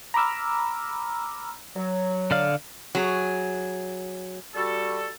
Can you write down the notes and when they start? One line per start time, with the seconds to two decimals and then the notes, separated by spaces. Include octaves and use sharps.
0.14 A#5 B5 D6 E6 F6
1.76 F#3
2.31 D3 D5 F5
2.95 F#3 G#4
4.55 G3 F#4 A4